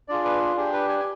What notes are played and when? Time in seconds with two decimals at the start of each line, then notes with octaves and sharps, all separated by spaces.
0.08 D4 F4 G#4 D5
0.25 B4
0.56 D4 G4 G#4
0.73 B4
0.89 G#5
1.00 G#5